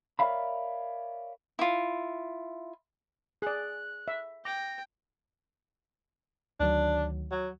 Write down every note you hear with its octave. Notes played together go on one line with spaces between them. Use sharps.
A#4 C#5 D5 E5 F5 B5
E4 F4
G#4 D5 F#6
E5
G5 D6 A#6
D2 D#3 F#3 D4
F#3